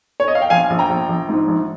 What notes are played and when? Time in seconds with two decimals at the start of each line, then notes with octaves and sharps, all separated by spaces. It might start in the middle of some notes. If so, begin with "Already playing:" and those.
0.20 C#5
0.28 D#5
0.35 F5
0.42 G5
0.50 A#1 F5 G#5
0.70 A#1
0.79 G5 A#5
0.89 A#1
1.08 A#1
1.29 G#2
1.48 A#1